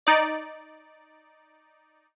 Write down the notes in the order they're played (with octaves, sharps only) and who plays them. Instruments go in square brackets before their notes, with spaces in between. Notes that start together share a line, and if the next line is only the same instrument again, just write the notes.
[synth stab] D#4 D5